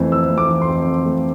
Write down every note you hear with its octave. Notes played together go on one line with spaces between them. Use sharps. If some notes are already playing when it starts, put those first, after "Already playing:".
Already playing: F2 E3 A3 C4
C4 E6
A3
D6
E3
C6
F2
C4
A3